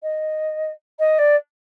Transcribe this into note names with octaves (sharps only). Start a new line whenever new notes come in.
D#5
D#5
D5